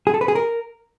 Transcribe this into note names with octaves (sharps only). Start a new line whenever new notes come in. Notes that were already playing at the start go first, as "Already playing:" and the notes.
G#4
A4
B4
G#4
A#4